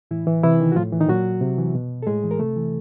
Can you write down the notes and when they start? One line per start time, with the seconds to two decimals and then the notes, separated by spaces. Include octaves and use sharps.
0.11 A2 E3 E4
0.27 E3
0.43 C3 E3 E4
0.60 D#3
0.72 F#4
0.76 A2 F3 F4
0.92 E3
1.00 D#3 D#4
1.08 A#2 F#3 F#4
1.41 C3
1.58 E3
1.75 B2
2.03 A4
2.07 A2 G#3 G#4
2.24 E3
2.31 A#4
2.39 C3 A3 A4
2.56 E3